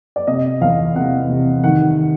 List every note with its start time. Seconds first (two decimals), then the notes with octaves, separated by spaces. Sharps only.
0.16 D5
0.27 C3 D#5
0.61 E2 F5
0.96 C3 F#5
1.30 C3
1.64 D#3 F#5